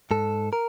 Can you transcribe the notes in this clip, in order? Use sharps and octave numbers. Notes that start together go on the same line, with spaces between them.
G#2 A4
A#4